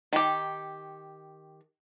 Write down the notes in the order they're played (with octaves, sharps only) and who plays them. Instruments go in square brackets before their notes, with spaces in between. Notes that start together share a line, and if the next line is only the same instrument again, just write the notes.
[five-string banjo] D#3 G4